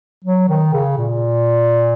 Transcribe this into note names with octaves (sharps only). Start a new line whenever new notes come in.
F#3
D#3
C#3
A#2